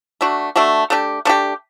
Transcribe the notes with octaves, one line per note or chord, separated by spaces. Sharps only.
A3 D4 F#4
A3 D4 F#4
A3 D4 G4
A3 D4 G4